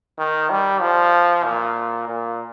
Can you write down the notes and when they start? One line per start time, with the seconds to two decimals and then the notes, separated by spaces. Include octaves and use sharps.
0.18 D#3
0.50 G3
0.81 F3
1.45 A#2
2.08 A#2